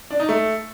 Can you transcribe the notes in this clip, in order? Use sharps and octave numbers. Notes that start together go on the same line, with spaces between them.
D4
D#4
A3